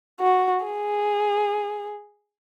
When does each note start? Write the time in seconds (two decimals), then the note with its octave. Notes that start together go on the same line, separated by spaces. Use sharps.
0.20 F#4
0.65 G#4